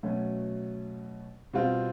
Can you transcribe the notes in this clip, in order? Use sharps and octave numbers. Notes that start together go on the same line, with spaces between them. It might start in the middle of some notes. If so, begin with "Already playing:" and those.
B2 F#3 A3 C#4
B2 G3 C4 F4